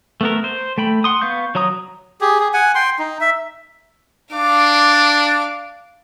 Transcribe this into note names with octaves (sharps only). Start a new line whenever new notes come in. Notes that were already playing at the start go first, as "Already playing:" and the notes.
A3 B3 A#4
C5
A3 G5 B5
F#5 C6 D#6
B3 F5 C#6 G6
F#3 C#5 A#5 D#6
G4 G#4
G#4
F#5 G#5
G5 C6
D#4
E5
D4 F5 D6